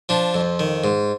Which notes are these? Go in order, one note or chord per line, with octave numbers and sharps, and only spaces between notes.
F3 D4
F2
D#3
G#2